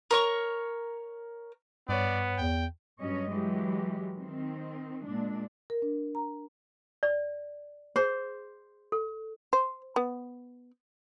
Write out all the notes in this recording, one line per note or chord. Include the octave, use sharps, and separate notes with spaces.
A#4 C#5 C#6
G2 B3 C#5 D5
E2 G5
G2 F#3 G3 C#4 C#5 D#5
E3 F#3 G#3 G4
D#3 C4
A#2 G#3 D4
A#4
D4
A#5
D5
G#4 C5
A4
C5
B3